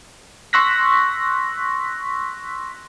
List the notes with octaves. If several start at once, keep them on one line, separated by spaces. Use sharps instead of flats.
C6 C#6 E6 F#6 A#6 B6